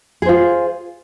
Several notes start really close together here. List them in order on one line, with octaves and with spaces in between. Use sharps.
G#4 C5 F4